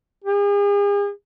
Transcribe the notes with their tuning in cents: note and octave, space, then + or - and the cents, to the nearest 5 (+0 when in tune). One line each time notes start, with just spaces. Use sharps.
G#4 -40